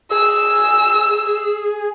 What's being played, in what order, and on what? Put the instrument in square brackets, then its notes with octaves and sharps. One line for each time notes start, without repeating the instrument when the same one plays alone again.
[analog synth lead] G#4 [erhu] E6